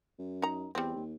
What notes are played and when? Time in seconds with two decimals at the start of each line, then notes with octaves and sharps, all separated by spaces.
0.19 F#2
0.42 D#4 A#5
0.75 E2 G3 C4
0.96 D#2